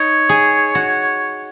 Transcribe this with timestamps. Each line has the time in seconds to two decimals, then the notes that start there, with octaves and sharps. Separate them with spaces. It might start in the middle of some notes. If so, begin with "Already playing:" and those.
Already playing: D#4 C#5
0.29 G#4
0.75 F#4